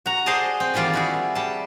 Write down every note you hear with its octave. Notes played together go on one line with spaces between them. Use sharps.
F#4 A#5
G#4 C5 D5 D#5 G#5 A5
C4
D#3 E3 G3 F4 D5
E4 F#4 G#4
G3 A5